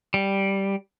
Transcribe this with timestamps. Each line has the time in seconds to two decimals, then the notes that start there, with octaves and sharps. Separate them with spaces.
0.14 G3